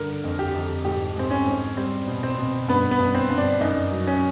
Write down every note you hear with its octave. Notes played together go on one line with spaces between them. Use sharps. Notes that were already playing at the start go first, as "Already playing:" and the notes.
Already playing: G2 D3 A#4
F2
G4
F2
G#2 G4
G#2 C4
C#4
G#2
G3 C4
B2
C4
B2
G2 B3
B3
G2
C4
G2
D4
F#2 D#4
F#3
C#4